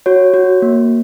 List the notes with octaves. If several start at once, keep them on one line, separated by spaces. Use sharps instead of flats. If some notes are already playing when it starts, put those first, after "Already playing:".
F#4 C#5
F#4
A#3